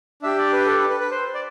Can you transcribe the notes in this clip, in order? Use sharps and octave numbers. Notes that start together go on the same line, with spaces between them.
D4 G4 E5
D5
B4
A4
B4
B4
B4
C5
D5